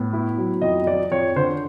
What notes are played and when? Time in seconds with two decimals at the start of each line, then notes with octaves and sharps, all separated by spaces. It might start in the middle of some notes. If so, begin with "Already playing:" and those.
Already playing: A2 B3
0.13 E4
0.38 F#3
0.62 F2 D#5
0.86 F3 D5
1.11 F2 C#5
1.36 D3 C5